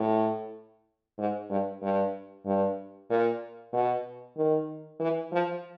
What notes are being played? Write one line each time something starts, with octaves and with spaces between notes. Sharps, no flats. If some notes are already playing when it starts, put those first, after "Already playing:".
Already playing: A2
G#2
G2
G2
G2
A#2
B2
D#3
E3
F3